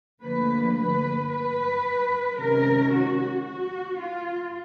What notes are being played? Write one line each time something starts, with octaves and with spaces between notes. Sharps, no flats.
D2 D3 F3 A#3 B4
B4
B4
C3 D#3 G#3 C#4 A#4
F#4
F#4
F4